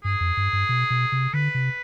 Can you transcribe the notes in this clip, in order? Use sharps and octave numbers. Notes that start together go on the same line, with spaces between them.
G2 G#4
F2
G2
G2
B2
B2
C3
D3 B4
C3